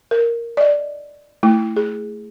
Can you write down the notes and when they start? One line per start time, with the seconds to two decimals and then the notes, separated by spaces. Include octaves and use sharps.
0.11 A#4
0.57 D5 D#5
1.43 A3 E4
1.76 G#4